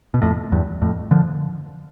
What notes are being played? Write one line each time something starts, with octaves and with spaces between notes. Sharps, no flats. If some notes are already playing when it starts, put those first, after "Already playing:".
B2
F2 A2
E2 G2
F2 A2
D3 F3